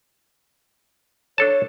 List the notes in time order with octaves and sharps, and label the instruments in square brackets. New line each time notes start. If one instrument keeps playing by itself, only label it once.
[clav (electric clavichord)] D4 A4 A5 [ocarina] C#5